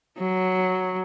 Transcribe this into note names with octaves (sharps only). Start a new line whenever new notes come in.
F#3